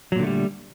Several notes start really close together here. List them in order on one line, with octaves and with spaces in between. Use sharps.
F#3 A#2 D3 A3 G3